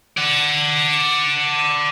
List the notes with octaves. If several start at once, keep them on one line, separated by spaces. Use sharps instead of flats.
D5 F#5